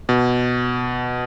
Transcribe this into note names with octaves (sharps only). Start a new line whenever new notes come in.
B2